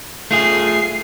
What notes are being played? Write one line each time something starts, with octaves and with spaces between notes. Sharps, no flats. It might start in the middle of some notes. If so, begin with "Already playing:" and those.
A3 F4 G#4 C7